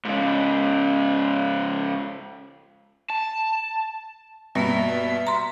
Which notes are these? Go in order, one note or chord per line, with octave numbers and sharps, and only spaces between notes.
G#2 C#3
A5
G2 B2 G3 A#3 B3 E5
A#5 C6